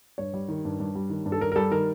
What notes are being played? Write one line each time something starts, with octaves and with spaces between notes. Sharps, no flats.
G2 C#5
G3
D#3
G2
G2
G3
D#3
G2
A4
G2 A#4
A#4
G3 A4
D#3 A#4